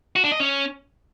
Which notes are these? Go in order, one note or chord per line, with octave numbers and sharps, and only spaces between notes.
F#4
D4
D#5
C#4